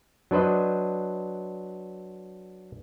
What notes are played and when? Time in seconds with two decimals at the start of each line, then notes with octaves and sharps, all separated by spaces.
0.31 F#3 D4 B4 C5 D#5